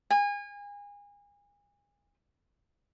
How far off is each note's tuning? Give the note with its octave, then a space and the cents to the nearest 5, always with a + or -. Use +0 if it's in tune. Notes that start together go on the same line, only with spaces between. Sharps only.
G#5 -30